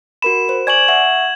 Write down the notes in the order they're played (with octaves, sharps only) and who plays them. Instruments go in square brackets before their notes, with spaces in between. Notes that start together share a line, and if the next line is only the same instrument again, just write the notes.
[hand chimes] F#4 A#4 B5 [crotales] E7
[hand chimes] C5
[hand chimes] D5 G#5 C#6 [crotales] G#6 F#7
[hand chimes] E5 F#5 C#6